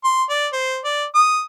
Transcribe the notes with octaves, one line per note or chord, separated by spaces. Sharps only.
C6
D5
C5
D5
D#6